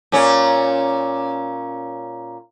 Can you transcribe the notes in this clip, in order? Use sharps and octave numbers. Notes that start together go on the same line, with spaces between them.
A#2 C#4